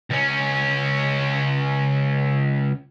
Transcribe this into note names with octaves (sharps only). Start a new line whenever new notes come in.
C#2 C#4